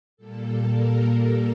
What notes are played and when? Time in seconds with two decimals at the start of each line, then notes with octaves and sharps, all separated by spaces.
0.17 A#2 G3 A#3 A4
0.61 A#4